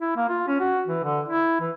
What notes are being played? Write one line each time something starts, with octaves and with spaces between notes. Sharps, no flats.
E4
A#3
F4
C#4
F#4
E3
D3
E4
E3